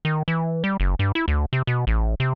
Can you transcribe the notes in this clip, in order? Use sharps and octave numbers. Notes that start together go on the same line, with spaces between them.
D#3
E3
G3
F#1
G2
E4
D2
C3
B2
A1
C3